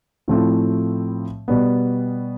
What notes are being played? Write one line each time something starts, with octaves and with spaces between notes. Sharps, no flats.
A2 F3 A3 C4 E4
B2 G3 B3